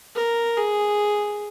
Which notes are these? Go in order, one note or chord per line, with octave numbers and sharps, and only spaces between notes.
A#4
G#4